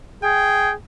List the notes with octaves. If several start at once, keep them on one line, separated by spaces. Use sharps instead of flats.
G#4 G5